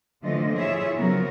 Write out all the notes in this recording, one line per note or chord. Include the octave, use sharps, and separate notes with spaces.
D3 E3 F3 A3 F4 D#5
E4 F4 G#4 C#5 E5
C#3 F3 F#3 B3 F#4 A#4